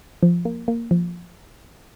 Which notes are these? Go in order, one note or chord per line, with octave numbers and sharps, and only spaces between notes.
F3
A#3
A#3
F3